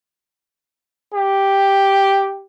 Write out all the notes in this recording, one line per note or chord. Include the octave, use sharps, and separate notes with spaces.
G4